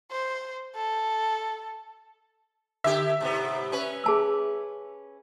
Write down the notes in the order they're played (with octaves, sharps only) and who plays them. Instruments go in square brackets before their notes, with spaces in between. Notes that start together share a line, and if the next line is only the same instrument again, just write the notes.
[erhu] C5
A4
[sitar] D3 G4 [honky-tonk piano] E5
[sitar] G#2 C3 B3
C#4 B4
[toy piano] G#4 A5 E6